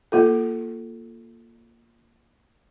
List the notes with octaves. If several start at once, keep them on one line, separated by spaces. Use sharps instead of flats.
A#3 F4 A4